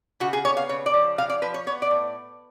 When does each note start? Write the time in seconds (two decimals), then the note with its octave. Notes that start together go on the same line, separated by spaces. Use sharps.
0.20 C#3 F#4
0.33 G#4
0.45 B3 C#5
0.57 F5
0.69 C#3 C#5
0.86 D5
0.94 F3
1.18 C#3 F5
1.30 D5
1.42 F3 B4
1.54 C#5
1.66 B3 C#5
1.82 D5
1.91 A2